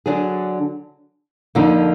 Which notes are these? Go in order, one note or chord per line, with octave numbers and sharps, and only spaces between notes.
D3 F#3 D4 G#4
F2 D3 F3 A#3 D#4